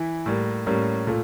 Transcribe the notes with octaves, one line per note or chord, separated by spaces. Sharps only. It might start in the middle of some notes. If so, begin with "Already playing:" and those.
Already playing: E3 E4
A2 G3 A#3
A2 G3 A#3 C#4
A#2 A3